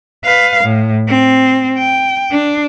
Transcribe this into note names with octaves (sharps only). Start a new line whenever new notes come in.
B4 F5
A2
C4
G5
D4